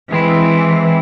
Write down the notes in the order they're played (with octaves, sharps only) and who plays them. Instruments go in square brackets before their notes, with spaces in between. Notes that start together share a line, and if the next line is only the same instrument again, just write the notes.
[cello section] E3 [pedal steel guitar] G#3 C4 E4